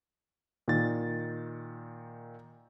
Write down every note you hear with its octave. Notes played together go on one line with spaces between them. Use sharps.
A#2 D#3 A6